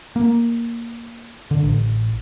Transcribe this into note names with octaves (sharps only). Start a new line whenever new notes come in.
A#3
D3
A1